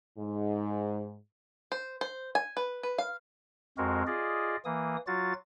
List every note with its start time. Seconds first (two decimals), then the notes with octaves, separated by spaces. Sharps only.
0.18 G#2
1.72 C5
2.01 C5
2.35 G#5
2.57 B4
2.83 B4
2.98 F5
3.78 F2 G#3 C4 F#4 A#4
4.07 F4 G#4 D5 D#5
4.65 E3 A#3 D#6
5.07 F#3 F4 F#4 A6